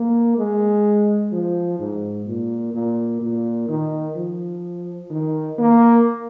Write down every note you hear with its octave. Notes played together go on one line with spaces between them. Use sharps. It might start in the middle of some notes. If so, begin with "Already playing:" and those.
Already playing: A#3
G#3
F3
G#2
A#2
A#2
A#2
D#3
F3
D#3
A#3